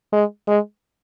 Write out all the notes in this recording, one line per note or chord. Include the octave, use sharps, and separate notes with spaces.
G#3
G#3